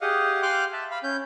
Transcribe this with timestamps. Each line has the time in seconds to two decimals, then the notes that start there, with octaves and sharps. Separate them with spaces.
0.01 G4 G#4 D#5 F5 F#5
0.42 F5 G5 C6 D6 F6 F#6
0.73 E5 A5
0.91 F5 B5
1.03 C#4 G6